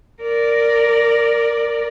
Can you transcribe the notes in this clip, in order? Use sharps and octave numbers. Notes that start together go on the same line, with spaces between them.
A#4 D5